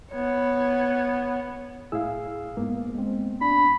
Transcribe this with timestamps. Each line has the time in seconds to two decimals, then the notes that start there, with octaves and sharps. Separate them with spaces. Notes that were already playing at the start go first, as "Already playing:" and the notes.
0.12 B3 C#5
1.92 A2 E4 G#4 F5 E6
2.57 G#2 A#3 B3
2.95 G#3 C4
3.41 D4 B5